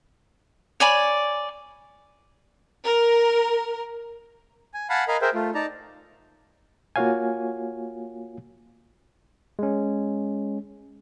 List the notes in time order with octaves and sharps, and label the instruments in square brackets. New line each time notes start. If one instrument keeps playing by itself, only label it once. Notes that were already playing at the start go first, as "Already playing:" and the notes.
[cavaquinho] C#5 D5 G#5 B5
[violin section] A#4
[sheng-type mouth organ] G#5
F5 F#5 G#5 A5 B5
A#4 D#5 F5 G#5 A#5 B5
G#4 A#4 C5 E5 G5
A3 F4
D#4 D5 A5 A#5
[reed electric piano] A#3 F4 F#4 C#5 F5 G#5
[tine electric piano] G#3 C#4